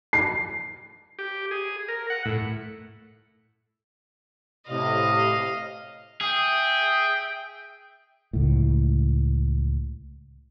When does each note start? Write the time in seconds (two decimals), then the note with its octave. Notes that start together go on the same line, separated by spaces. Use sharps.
0.13 C7
1.19 G4
1.51 G#4
1.88 A#4
2.10 F#5
2.25 A2
4.69 A2 C3 D#5 F5
6.21 G#4 E5 G5
8.33 C#2 A2